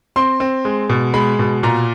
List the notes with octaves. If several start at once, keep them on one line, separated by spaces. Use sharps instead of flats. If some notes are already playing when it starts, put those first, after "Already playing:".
C4 C6
C4
G#3
B2
G#3 B5
B2
A#2 A#5